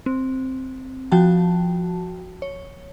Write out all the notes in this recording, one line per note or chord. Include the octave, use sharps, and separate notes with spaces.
C4
F3 F#4 G5 A5
C#5